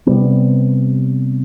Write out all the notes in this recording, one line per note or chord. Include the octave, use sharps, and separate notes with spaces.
C3 G3 B3